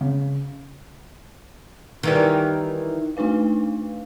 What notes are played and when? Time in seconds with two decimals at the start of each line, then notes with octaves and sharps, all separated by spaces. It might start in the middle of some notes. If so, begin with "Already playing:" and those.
0.01 C#3
2.03 D#3 E3 G3
3.17 A3 D4 D#4 B4 F5